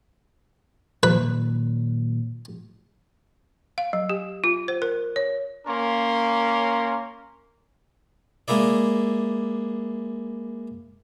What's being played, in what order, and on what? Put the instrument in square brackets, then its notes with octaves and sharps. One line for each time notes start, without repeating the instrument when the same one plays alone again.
[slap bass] A#2 D#3 F#3 [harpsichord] B4
[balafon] F5
F#3
G4
F4
C5
A#4
C#5
[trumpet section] A#3 C#4 A#4 C6
[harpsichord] G#3 A#3 E4 D5